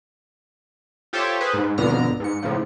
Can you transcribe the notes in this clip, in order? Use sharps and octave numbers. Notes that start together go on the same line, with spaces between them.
F4 G4 A4 C5 C#5 E5
G#4 B4 C5
G#2
G#1 F2 B2 D3 A#5 F6
G#2 C#7
A2 C#3 F3